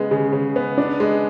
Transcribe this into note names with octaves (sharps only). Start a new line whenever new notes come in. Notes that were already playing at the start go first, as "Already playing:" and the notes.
Already playing: C#3 G#3 B3
C#3
C#3
B3
D4
G#3